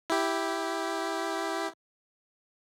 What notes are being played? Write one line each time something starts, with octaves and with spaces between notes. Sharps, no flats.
E4 G4